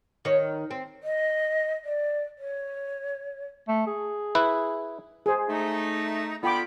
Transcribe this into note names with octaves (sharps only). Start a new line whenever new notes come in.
D#3 C#5
C4
D#5
D5
C#5
A3
G#4
E4 B4
G#4 C5
A3 D#4
D3 B3 F4 G5 B5 D6